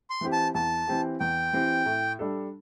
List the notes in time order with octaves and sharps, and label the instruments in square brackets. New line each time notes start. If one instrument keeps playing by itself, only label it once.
[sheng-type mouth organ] C6
[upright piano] E3 C4 G4
[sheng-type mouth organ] A5
[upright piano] E2 [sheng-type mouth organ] A5
[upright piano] E3 C4 G4
[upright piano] E2 [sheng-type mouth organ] G5
[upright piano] E3 C4 G4
A2
G3 D4 A4